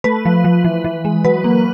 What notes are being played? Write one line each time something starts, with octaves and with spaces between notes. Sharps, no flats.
A3 B4
F3
F3
E3
E3
G#3
F#3 B4
A#3